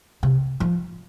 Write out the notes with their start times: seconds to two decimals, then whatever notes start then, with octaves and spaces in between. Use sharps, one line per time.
0.23 C3
0.60 F3